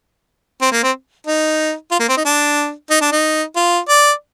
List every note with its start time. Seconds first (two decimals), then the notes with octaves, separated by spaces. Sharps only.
0.61 C4
0.72 A#3
0.83 C4
1.27 D#4
1.91 F4
1.99 A#3
2.09 C4
2.17 D#4
2.25 D4
2.90 D#4
3.01 D4
3.12 D#4
3.56 F4
3.88 D5